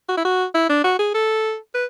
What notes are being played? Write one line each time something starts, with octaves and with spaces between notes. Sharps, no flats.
F#4
E4
F#4
E4
D4
F#4
G#4
A4
B4